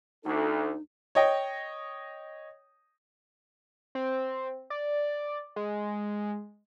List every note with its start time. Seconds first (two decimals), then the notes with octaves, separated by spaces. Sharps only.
0.24 D2 D#4 A4
1.15 C#5 D#5 G5
3.95 C4
4.70 D5
5.56 G#3